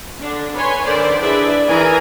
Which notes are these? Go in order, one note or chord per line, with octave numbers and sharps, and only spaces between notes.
D3 D4
B4 C#5 G#5 C6
D3 D#3 B4 C5 D5
D4 E4 G#4 B4 D5 E5
E3 G#4 A#4 G#5 A#5